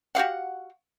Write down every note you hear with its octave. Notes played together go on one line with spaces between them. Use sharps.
F#4 G4 F5 F#5